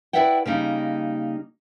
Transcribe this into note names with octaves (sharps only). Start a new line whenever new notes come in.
E4 B4 D5 E5 F#5 G5
C#3 G3 A#3 D#4